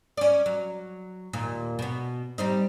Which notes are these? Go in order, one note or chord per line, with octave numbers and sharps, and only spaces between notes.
C#4 D5
F#3
D#2 A#2
B2 B3
G3 C4 D#4